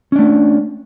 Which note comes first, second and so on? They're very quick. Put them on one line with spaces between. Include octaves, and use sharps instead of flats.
C#4 D4 A3